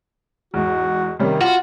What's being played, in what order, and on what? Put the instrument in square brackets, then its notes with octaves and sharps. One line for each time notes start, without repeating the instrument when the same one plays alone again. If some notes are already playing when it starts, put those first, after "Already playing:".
[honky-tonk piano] E2 G#2 [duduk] F#4
[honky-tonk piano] C3 G3 C#4 [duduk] D#3
[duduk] F4 [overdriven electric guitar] F#4